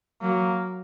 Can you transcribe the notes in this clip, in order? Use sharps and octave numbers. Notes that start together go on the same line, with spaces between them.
F#3 A#3